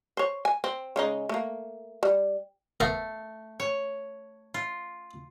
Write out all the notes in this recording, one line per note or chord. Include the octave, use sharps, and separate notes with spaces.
C5 C#5
G#5
C4
C#3 G#3 D#4
A3 A#3
G3
A3 B3 A#4 F5
C#5
F4